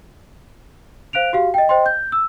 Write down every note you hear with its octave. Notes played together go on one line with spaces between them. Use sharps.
C5 F5 F#6 D7 F7
F#4 G4 F5
D#5 G5
C5 D#5 G5 C6
G6
E6